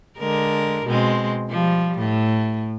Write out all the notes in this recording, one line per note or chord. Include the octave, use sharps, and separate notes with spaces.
D3 G#3 A#4
B2 G#3 C4
F3 G3
A2